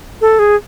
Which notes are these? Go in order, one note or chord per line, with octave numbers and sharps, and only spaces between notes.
A4
G#4